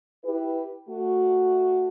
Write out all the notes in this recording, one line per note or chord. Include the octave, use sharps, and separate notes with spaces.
E4 G4 B4
A3 F#4